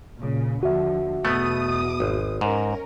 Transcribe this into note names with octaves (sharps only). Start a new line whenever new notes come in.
A#2 C#3
D#2 D3 F3 F#4 E5
E2 B2 A3 B3 D#6
G#1
G#2 C#4 A#4